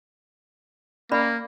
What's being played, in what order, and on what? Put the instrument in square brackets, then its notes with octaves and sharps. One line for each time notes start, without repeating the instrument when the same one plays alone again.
[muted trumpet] A#3 [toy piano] C#4 D5 B5